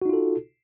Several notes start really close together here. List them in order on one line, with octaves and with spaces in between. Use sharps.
F#4 D#4 F4 A4